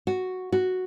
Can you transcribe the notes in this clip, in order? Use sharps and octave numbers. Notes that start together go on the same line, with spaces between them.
F#4
F#4